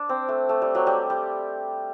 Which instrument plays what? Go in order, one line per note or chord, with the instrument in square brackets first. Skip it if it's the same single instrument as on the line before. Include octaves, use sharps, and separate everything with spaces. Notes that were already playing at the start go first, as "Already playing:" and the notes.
Already playing: [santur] D4
C4
A3
A3
G3
F#3
G3
G3